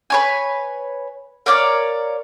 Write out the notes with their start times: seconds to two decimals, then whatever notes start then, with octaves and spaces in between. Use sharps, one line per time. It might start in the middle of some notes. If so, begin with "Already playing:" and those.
0.10 B4 C#5 G#5
1.46 A#4 C#5 D5 F5